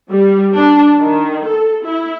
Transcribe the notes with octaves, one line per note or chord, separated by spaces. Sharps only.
G3
D4
D#3
A4
E4